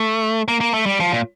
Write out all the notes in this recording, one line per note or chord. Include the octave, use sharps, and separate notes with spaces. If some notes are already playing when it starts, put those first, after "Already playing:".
Already playing: A3
A#3
A#3
A3
G3
F3
A#2